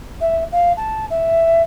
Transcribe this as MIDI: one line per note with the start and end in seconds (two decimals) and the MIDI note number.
0.20 0.44 76
0.52 0.72 77
0.77 1.05 81
1.10 1.62 76